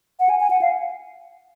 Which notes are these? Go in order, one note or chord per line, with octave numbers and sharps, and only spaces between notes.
F#5
G#5
G#5
F#5
F5